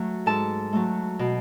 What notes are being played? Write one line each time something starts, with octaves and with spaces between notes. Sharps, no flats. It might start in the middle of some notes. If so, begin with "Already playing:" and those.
Already playing: F#3 A3
G#2 A4 A5
F#3 A3
B2